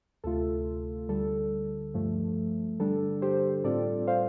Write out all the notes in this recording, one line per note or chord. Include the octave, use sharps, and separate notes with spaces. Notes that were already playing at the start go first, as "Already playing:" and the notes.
D2 C3 A3 F4 A4
D2 D3 G3 A4
G2 F3 A3
G2 D3 G3 D4 A4
G4 C5
A2 G3 C4 F4 A4 D5
C5 F5